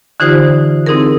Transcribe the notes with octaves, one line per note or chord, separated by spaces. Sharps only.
D3 E3 D#4 F4 G4 C5
C4 D#4 E4 G#4 A#4